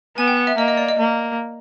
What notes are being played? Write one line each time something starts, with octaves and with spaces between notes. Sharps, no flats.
B3 G#5
G5
F#5
E5
A#3 D#5
D#5
D5
D#5
A#3